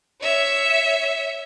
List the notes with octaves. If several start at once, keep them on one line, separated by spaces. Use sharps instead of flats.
C#5 E5